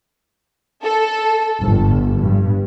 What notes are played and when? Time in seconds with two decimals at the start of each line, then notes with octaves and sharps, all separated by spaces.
0.82 A4
1.60 G1
2.22 G2